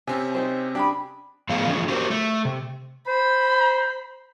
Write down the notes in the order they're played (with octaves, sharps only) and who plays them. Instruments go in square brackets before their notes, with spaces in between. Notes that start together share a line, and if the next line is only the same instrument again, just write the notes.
[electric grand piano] C3 C4 C#4 [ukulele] G#5
[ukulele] D#4 G#4 C5
[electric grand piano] D4 [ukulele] G4 G#4 B5
[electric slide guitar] A2 F3 B3 G#4 F5
D3 E3 F3 A3 C4 C#4
F#4 G4 A#4 C5
A3
C3
[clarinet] C5 [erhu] B5